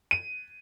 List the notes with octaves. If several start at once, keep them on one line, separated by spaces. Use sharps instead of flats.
D#7